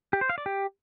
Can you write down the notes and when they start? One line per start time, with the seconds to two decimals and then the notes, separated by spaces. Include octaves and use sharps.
0.13 G4
0.21 C5
0.29 F5
0.38 D5
0.46 G4